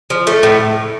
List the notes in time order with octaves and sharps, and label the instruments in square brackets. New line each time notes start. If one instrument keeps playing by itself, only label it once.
[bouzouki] F3
A3
A2